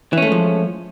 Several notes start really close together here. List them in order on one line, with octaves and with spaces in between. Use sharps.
E3 C#4 A3 G#3 F3